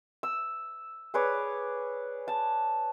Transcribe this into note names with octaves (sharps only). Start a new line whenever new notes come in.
E6
G#4 B4 C#5 D5
A5